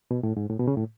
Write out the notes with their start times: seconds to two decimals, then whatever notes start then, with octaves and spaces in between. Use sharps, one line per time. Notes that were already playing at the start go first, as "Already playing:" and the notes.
0.11 B2
0.23 A2
0.37 G#2
0.50 A2
0.59 B2
0.68 C#3
0.77 A2